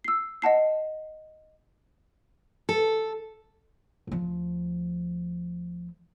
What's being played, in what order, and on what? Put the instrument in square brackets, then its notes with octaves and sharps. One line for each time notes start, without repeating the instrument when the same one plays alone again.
[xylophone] E6 C7
D#5 F#5 A5 C7
[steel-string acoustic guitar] A4
[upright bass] D2 F3